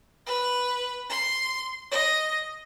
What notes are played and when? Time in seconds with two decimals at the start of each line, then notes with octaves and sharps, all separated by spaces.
0.27 B4
1.10 C6
1.92 D#5